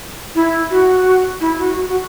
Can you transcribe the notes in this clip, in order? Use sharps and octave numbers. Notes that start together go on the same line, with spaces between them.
E4
F#4
E4
F#4
F#4
F#4